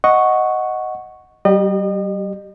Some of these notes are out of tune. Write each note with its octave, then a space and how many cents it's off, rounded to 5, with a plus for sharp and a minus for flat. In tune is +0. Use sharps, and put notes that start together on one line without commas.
D#5 +0 F#5 +0 C#6 +0
G3 -40 G4 +0 D#5 -40